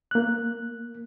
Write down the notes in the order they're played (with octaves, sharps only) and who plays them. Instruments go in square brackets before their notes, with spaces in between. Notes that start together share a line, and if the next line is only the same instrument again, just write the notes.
[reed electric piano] A#3 F#6